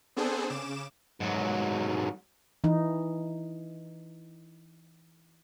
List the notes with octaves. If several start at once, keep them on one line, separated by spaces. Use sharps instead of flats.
B3 C4 D4 G#4 A4 C5
C#3 D6 E7
G#2 F#3
E3 D#4